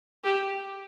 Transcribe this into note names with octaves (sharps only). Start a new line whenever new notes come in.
G4